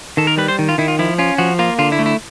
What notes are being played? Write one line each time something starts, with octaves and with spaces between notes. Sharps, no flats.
D#3 A4
A#4
G3 B4
C5
D#3
F4
D#3 E4
F4
F3 E4
C#4 F4
F3 F#4
A#3 F4
D3 F4
E4
A3
E4